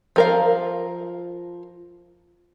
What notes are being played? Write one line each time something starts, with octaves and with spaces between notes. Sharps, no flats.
F3 A#4 F5